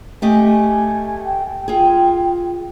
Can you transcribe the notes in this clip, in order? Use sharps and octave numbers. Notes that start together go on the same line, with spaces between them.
A3 G4 D#5 G#5
G5
F4 G#4